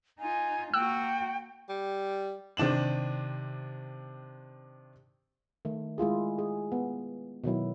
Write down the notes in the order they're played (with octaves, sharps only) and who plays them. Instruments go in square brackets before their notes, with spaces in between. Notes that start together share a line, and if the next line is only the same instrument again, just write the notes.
[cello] D#4 F4 [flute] G#5
[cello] A#3 F#4 [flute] G5 [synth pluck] E6 F#6
[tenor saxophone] G3
[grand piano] C3 D#3 D4 E7 F#7
[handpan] D#3 A3
G#3 E4 F4 G#4
G#4
B3
B2 D#3 F#3 E4